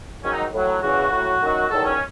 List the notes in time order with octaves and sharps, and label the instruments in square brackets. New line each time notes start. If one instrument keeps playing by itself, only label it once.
[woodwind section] G#2 D#3 F#3 C#4
D#4
A2 F#3
E2 C#3 E3 F#4
A2 F#3
F#2 D#3 F#3
E2 D#3 F#3 A4
C#4